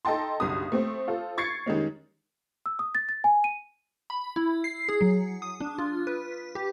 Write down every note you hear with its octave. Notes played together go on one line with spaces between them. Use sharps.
D#4 A4 D#5 G5 A5 C6
F#1 B1 G2 D#6
A3 C4 C5
F4 A4 C5
C#6 G#6 A6 C7 C#7
D#3 G3 G#3 C#4
E6
D#6
A6
A6
G#5
D#7
B5
E4
C7
G#4
F#3
D#6
D4
F4
B4
G4